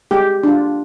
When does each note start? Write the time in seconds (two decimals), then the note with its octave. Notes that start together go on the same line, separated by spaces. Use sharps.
0.11 G#3 G4
0.43 D4 F4